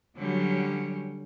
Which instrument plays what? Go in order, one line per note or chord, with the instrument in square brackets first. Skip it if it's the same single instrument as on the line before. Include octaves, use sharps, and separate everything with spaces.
[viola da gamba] D3 G3 C#4 [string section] F#3